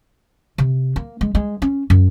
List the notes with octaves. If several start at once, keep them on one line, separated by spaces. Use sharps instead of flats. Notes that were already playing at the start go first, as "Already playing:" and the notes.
C3
A#3
G#3
G#3
C#4
F#2